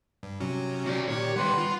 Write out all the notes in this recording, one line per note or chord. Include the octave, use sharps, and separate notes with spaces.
G2
C3 F#3 C#4
F#4 D5
A#2 D#3 G4 C#5 D5
D#3 G3 B4 F#5 C6
F4